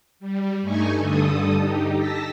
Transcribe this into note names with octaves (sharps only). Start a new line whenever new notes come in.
G3
G2 A3 D#4 G#5 C#6
G2 D3 A4 D#6
D#4 G4
A5 E6 A#6 B6